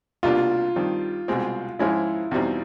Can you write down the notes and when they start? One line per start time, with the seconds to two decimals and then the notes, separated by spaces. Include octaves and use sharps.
0.23 C2 B2 G3 A#3 D4 F4
0.76 G2 D#3 G3 C4
1.28 C2 B2 G#3 C4
1.79 G#2 F3 G#3 C#4 E4
2.31 E2 B2 G3 C4 D#4